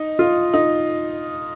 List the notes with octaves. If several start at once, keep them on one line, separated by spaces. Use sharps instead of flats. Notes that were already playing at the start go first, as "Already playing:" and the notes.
Already playing: D#4
F4
D#4